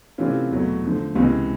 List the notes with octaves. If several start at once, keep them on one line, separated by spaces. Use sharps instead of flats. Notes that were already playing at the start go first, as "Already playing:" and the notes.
C3 E3 A3 C#4 F4
E2 B2 F#3 A3
D3 F3 A3
C#2 C3 E3 G#3